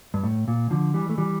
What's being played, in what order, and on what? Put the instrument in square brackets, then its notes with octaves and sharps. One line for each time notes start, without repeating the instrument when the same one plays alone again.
[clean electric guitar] G2
A2
A#2
D3 F3
E3 G3
A3
E3 G3